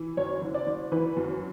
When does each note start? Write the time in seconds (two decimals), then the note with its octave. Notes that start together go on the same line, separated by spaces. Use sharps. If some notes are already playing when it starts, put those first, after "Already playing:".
Already playing: E3
0.17 F#2 C#5
0.42 F#1
0.54 D5
0.67 F#1
0.92 E3 B4
1.17 F#2